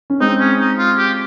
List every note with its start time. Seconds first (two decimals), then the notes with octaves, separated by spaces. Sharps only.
0.10 C#4
0.20 G#3 C4 D#4
0.40 C#4
0.59 D#4
0.78 F4
0.97 G4